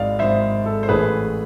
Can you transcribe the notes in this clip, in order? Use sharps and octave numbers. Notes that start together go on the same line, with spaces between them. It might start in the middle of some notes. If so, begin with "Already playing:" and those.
Already playing: G#1 G#2 G#3 D5 F5
G#1 G#2 G#3 C5 E5
A4
C5
A1 A2 E3 A3 G#4 B4